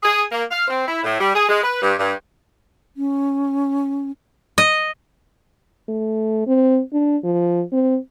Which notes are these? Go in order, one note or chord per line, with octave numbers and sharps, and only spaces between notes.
G#4
A#3
F5
C4
E4
A2
G3
G#4
G#3
B4
G2
G2
C#4
D#5
A3
C4
D4
F3
C4